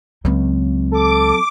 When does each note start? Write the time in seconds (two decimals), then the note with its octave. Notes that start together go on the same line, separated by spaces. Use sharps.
0.25 C#2 F#3 C4
0.93 A4 D6